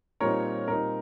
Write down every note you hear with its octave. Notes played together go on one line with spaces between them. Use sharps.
A#2 G3 C4 D#4 A#4 C#5
A#2 G3 C4 D#4 A#4